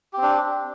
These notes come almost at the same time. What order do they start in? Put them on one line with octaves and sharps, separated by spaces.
G4 C4 D4